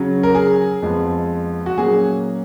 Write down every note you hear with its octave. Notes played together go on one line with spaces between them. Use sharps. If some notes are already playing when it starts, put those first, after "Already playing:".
Already playing: C#3 F#3 C#4
A#4
G#4
F2 F3 G#3 B3
F#4
A#2 F#3 A#3 C#4 G#4